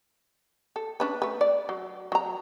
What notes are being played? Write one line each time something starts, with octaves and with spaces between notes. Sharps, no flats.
A4
C#4 D4 B4
A3 B4
D5
F#3
F#3 A#5